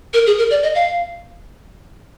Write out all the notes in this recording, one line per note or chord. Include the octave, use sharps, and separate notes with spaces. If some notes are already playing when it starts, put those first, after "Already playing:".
A#4
G#4
A#4
D5
D#5
F5